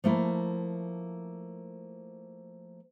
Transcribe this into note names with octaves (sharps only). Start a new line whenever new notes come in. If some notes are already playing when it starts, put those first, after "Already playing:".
F3 A3 A#3 E4